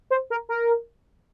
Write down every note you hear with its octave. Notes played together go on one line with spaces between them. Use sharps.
C5
A#4
A#4